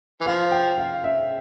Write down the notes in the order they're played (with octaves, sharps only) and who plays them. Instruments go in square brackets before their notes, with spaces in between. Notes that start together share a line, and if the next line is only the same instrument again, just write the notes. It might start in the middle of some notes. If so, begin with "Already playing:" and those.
[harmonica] E3
[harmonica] F3 [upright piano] F5
[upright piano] G5
F5
E5